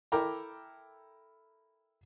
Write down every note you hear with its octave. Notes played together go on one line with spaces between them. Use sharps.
E4 A4 A#4 G5 A#5 D6